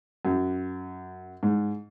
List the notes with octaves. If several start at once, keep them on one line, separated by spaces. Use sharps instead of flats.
F#2
G#2